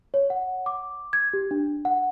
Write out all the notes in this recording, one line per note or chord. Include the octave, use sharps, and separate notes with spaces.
C#5
F#5
D6
G#6
G4
D4
F#5